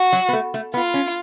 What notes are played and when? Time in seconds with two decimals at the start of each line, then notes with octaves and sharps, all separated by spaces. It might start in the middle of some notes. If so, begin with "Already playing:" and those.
Already playing: F#4
0.13 F#3
0.29 B3
0.33 A3
0.54 A3
0.74 B3 F4
0.94 C#4